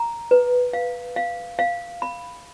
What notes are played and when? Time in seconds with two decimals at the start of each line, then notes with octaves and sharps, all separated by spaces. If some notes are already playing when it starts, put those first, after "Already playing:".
Already playing: A#5
0.31 B4
0.73 F5
1.16 F5
1.59 F5
2.02 B5